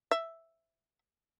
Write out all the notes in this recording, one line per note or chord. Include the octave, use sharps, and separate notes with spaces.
E5